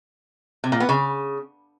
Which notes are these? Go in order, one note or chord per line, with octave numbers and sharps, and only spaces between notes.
C3
A#2
B3
C#3